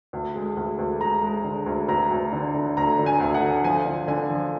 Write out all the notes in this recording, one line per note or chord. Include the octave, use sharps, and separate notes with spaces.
D2
G#3
D2
D2
G#3 A#5
G#3
D3
D2
D2 A#5
D2
D3
D3
D2 A#5
D3
G#5
D2
F#5
D3
F3 G#5
D3
D3 G#5
F3